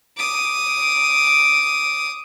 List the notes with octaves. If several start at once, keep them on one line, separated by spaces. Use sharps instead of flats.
D6 D#6